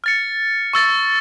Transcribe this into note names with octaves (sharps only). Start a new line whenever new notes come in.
F6 A6 C#7
C#6 E6 A6